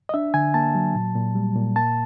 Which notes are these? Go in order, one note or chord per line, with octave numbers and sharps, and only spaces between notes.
D#5
D4 E5
D3 G#5
A#3 A5
F#3
A#2
A#2
G3
A#2
A#3 A5